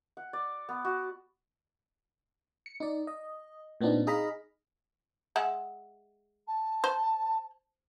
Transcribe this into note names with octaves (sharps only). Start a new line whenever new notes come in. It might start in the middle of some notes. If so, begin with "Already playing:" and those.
F#5
D5
B3
F#4
C#7
D#4 D5
D#5
A#2 B3 C4 D4 D#4
D#4 G#4 D#5 F5 A#5 B5
G#3 E5 F#5
A5
C5